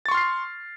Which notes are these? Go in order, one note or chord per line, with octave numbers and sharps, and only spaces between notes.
C6 C#6 F6 A6 C7